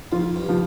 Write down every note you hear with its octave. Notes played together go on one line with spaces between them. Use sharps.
F2 F4
G2
F3